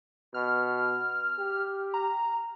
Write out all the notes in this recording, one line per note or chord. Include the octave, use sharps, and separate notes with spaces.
B2 F6
G4
A#5